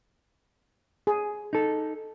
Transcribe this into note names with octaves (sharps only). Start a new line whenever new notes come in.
G#4
D#4 A4